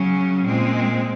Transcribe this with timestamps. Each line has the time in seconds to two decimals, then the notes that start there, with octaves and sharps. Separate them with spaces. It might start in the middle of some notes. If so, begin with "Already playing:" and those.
Already playing: C#3 F#3 C#4
0.44 A#2 G#3 C4